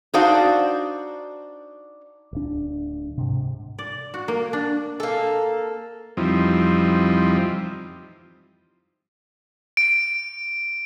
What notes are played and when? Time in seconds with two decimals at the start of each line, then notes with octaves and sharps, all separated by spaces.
0.14 D4 D#4 F#4 C5 D5 F5
2.33 D1 D4
3.17 G#2 C3
3.79 D5
4.14 F#4
4.28 A#3
4.53 D4
5.00 A#3 A4
6.17 F2 E3 F3 G3 C4 D#4
9.77 D7